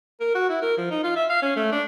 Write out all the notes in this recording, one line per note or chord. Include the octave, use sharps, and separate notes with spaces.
A#4
F#4
E4
A#4
F3
D#4
F4
E5
F5
C#4
A3
D4